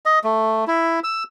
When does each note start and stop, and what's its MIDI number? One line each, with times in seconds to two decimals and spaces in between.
0.06 0.19 75
0.24 0.64 57
0.67 1.00 64
1.04 1.24 88